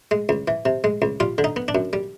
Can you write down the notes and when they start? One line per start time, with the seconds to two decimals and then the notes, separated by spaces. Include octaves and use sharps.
0.11 G#3
0.29 C#2
0.48 E3
0.65 C3
0.84 G#3
1.02 C#2
1.20 G3 F4
1.38 D3
1.44 D#4
1.56 B3
1.68 D4
1.75 F#2
1.93 G3